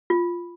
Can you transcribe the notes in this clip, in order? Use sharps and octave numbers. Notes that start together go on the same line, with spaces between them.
F4